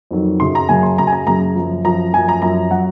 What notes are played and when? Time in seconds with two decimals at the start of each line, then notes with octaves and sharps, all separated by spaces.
0.11 F2 D#3 F#3
0.40 F#2 C#3 F#3 C6
0.55 A#5
0.69 F#2 C#3 F#3 G#5
0.83 C6
0.98 F#2 C#3 F#3 A#5
1.07 G#5
1.12 A#5
1.27 F#2 C#3 F#3 A#5
1.55 F#2 F3
1.84 F#2 F3 A#5
2.13 F#2 F3 G#5
2.29 A#5
2.42 F#2 F3 A#5
2.71 F#3 F#5